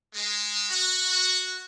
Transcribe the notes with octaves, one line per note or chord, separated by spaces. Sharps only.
G#3
F#4